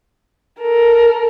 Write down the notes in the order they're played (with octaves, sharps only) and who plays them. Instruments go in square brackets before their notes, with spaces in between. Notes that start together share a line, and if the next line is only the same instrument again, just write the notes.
[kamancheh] A4 A#4